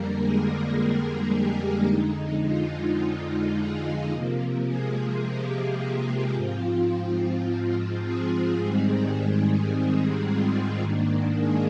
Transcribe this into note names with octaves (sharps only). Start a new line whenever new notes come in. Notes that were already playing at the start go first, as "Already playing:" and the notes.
Already playing: F2 D3 G3 A#3 A#4
G#3 G#4
G4
F2 D3 G#3 D#4
F4
F4
G#3 G#4
C3 F3 A#3
G#3 G#4
G4
G4
G#2 F3 C4 F4
G#3 G#4
G#2 D#3 G3 C4
F4
G#2 D#3 A#3 D4
G#3 G#4